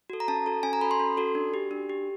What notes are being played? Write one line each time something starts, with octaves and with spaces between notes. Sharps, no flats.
F#4 A4
A#5
C#4 A5
F#4 A4
C#4 G#5
A#5
F#4 A4 B5
C6
C#4
F#4 A4
D4
G4
D4
G4